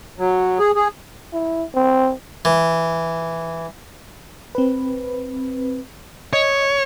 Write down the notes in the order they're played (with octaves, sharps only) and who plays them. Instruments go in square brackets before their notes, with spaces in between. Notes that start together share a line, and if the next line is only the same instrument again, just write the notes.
[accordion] F#3
G#4
G#4
[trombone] E4
C4
[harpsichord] E3
[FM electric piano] C4 B4
[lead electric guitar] C#5 [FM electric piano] D#5